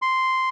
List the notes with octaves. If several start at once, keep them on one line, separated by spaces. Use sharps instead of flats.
C6